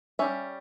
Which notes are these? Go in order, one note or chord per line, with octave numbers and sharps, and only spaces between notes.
G3 C#4 E5